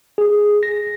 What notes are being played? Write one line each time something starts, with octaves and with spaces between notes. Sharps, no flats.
G#4
A#6